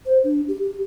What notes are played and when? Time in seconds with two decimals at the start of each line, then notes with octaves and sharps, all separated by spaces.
0.06 C5
0.24 D4
0.48 G4
0.62 G4